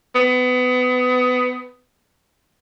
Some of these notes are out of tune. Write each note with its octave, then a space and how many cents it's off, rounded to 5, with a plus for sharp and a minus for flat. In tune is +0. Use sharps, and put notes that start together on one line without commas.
B3 +25